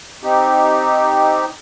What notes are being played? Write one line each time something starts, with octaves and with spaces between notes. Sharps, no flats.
C4 D#4 G4